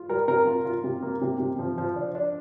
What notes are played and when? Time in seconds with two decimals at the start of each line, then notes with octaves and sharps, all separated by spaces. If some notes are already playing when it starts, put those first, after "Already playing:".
Already playing: F4
0.09 G3 A#4
0.28 C3 A#4
0.46 F4
0.65 F4
0.84 C3
1.03 A#3
1.22 C3
1.40 C3
1.59 F3
1.78 F3
1.96 D4
2.15 D4